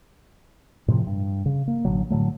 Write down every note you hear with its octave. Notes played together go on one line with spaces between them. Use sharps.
A2 C3 F3
G2
C#3
A#3
A1 B2 D3 F#3
A2 D3 F#3 A3